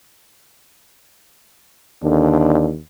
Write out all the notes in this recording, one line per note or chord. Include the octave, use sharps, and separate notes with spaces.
D#2 D3 D4